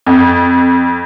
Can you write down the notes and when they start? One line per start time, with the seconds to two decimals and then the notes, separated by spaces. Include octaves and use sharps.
0.06 F2